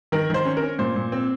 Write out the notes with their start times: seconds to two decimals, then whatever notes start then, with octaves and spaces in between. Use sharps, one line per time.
0.12 D#3 A#4
0.30 D#3 C5
0.45 C#4
0.57 A#4
0.62 C#4
0.79 A#2 C5
0.96 A#2
1.12 C4